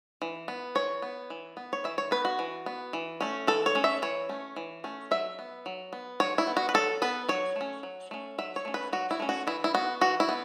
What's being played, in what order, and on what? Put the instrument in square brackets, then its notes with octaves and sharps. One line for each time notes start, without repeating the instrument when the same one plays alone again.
[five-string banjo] E3
B3
E3 C#5
B3
E3
B3
C#5
E3 E5
C#5
B3 B4
F#4
E3
B3
E3
A3 C#4
E3 A4
C#5
A3 C#4
E5
E3 C#5
A3 C#4
E3
A3 C#4
F#3 E5
B3
F#3
B3
F#3 C#5
E4
B3
F#4
B4
F#3 A4
B3 B4
F#3 C#5
A3 C#4
F#3
A3 C#4
F#3 E5
C#5
A3 C#4
B4
F#3 F#4
E4
A3 C#4
F#4
E3 E4
E4
B3 F#4
E3 F#4
E4
B3